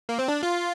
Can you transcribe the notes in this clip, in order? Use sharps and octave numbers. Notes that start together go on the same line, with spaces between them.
A#3
C4
D4
F4